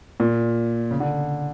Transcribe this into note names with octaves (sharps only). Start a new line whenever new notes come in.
A#2
C#3
D3